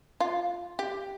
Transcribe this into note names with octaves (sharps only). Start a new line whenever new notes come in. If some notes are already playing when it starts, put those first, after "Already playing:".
F4
G4